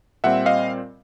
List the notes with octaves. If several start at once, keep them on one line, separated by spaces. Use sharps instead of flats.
A#2 G3 C4 E5 F#5
D#5 F5